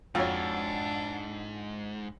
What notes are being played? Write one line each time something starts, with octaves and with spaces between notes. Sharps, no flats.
F2 G#2 D4 F4 F#4 C#5